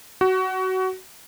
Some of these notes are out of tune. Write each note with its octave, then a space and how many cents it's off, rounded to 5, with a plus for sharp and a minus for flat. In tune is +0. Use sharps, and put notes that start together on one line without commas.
F#4 +20